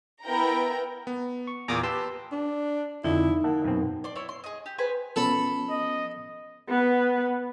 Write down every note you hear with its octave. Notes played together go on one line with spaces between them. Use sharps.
B3 E4 A#4 G5 A#5
B3
C#6
E2 A#2 A#5 D6 D#6
G4 B4 A5 C6 E6
D4
F2 D3 D#4 E4
A#3 E5 F#5 A5
F#2 B2 C4
D5 C6
E4 C#5
C6
G#4 D#5
G4
G#4 B4 C5 G#5
F3 B3 C#4 A4 B5
D#5
B3 B4